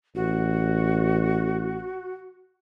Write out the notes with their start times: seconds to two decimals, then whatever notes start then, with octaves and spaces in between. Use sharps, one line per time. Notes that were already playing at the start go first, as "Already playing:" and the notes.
0.15 A1 F#4